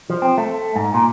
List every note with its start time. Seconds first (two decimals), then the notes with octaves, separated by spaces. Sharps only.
0.10 F3
0.22 C4
0.38 A3
0.76 G#2
0.94 A#2